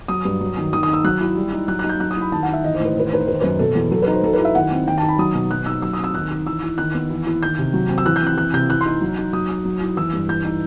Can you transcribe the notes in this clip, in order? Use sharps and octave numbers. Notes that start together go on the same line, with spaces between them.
F#3 D#6
G2
F#3
D#3
D#3 D#6
D#6
D#4
E6
F#3 F#6
E4
G3
D#4
F#3 F#6
F#6
D#4
G6
F#3 F#6
D#6
E4 B5
D#3 A5
F#5
D#4
E5
E3 D#5
C5
A2 B4
C5
D#3 B4
C5
D#4 B4
C5
D#3 B4
C5
F#2 B4
B2 A4
E2
F#3 A4
B4
D#4
C5
F#3 A4
B4
E4
E5
D#3 F#5
C4
D#3 G5
A5
D#4
B5
F#3 D#6
B2
F#3 F#6
D#4 E6
F#3 E6
D#6
C4 E6
D#3 F#6
D#4
E3 E6
E4
D#3 F#6
B3
E3
E4
D#3 G6
C3
F#3
C4
E6
E3 F#6
G6
C4 F#6
E3 F#6
C3 G6
E3 F#6
C6
D#4
F#3
D#4
F#3 D#6
D#4
F#3
E4
E3 E6
G2
E3 G6
D#4